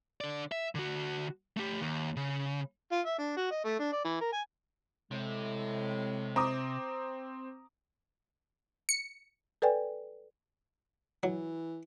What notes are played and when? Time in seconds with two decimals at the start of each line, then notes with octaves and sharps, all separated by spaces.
0.21 D3 D5
0.52 E5
0.75 D3 F#4
1.57 A3 G4
1.81 D#2
2.16 C#3
2.92 F4
3.06 E5
3.19 D4
3.37 F#4
3.51 D#5
3.65 A3
3.80 D4
3.93 D5
4.05 E3
4.21 A#4
4.33 G#5
5.12 A2 C3 G#3
6.36 C4 A#5 D6 D#6
8.89 C#7
9.62 A4 B4 D5 G5 G#5
11.23 E3 F#3